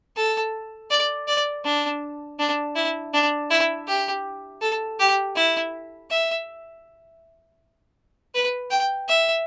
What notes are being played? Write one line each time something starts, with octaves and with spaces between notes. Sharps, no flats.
A4
D5
D5
D4
D4
E4
D4
E4
G4
A4
G4
E4
E5
B4
G5
E5